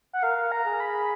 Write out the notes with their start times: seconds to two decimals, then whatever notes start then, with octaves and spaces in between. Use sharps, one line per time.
0.13 F#5
0.23 A#4 F5
0.52 A#5
0.65 G#4
0.80 B5